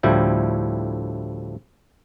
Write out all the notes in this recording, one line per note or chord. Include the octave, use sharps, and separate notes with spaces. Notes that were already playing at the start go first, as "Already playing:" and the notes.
D2 A2 F3 G3 E4 G5